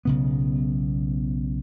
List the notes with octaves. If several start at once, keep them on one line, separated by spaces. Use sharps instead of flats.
B1 C#3 B3